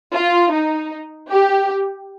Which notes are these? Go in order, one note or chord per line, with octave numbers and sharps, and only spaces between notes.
F4
D#4
G4